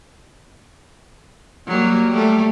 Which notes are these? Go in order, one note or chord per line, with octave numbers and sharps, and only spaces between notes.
F#3 G3 A#3
G3 A3